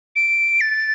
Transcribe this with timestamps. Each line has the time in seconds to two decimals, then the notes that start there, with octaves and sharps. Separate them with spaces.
0.16 D7
0.61 A6